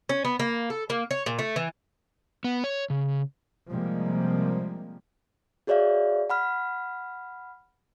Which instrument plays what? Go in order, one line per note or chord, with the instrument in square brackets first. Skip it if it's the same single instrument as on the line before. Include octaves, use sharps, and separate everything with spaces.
[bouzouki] C#4
B3
A#3
A4
A#3
C#5
A#2
A3
E3
[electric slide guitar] B3
C#5
C#3
[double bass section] C3 F3 G3 G#3 A#3
[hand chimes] F#4 G#4 C#5 D5 E5 F5
F#5 B5 F6